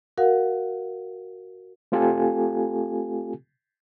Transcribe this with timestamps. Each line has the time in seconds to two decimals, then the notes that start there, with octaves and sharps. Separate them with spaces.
0.18 F#4 A#4 F5 F#5
1.92 A3 C4 F4 G4 A4 G#5